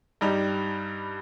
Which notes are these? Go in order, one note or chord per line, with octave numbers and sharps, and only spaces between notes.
G2 G3 D#4